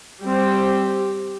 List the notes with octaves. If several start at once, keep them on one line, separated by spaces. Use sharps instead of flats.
G3 C4 G4